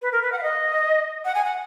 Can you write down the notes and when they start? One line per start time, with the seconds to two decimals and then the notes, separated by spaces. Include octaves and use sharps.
0.02 B4
0.12 A#4
0.22 B4
0.32 F#5
0.38 F5
0.43 D#5
1.25 F#5
1.35 G#5
1.45 F#5